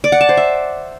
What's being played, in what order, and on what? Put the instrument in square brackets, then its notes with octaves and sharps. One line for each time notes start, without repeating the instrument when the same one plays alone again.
[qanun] D5
F#5
A5
C5
E5